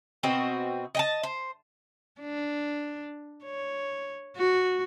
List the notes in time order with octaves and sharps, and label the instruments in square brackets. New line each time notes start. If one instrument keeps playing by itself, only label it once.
[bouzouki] B2 C4 F#4 D#5
D#5 G5 A5
C5
[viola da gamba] D4
C#5
F#4